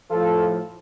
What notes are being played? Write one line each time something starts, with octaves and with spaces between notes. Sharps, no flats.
A2 F3 F4 A4